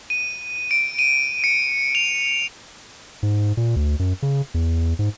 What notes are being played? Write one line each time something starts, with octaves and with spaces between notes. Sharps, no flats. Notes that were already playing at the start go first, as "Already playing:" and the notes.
D#7
D7
D#7
C#7
F7
G#2
A#2
D2
F#2
C#3
E2
G#2